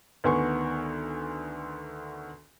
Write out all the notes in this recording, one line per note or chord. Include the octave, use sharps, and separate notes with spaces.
D2 D#3 B3 G#5 C6 C#6